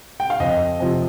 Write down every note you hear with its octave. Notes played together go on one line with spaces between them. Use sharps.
G5
F5
F2 D#5
C3 F3